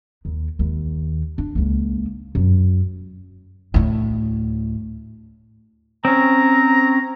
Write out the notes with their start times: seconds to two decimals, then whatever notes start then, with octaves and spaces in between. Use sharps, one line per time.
0.25 D#2
0.59 D#2
1.38 D4
1.55 C#2 A#3
2.35 F#2
3.74 D2 A2
6.05 C4 C#4 A#5